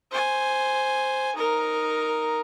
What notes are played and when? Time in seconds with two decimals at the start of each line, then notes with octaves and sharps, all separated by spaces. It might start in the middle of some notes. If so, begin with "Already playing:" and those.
0.11 C5 G#5
1.36 D#4 A#4